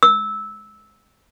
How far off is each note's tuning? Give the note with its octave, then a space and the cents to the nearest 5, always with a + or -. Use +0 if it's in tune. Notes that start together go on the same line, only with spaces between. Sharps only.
E6 -15